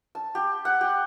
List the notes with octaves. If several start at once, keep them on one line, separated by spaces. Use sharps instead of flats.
A5
G4
F#5
G4